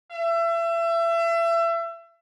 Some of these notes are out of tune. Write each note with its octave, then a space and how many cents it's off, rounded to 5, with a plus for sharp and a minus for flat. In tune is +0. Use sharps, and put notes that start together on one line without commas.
E5 +30